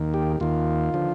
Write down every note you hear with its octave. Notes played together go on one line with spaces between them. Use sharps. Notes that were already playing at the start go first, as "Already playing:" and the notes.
Already playing: D#2 D#3
G4
D#2 D#3 F4
D3 F3